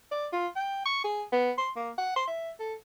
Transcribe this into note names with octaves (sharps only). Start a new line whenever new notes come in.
D5
F4
G5
C#6
G#4
B3
C6
A#3
F#5
C6
E5
A4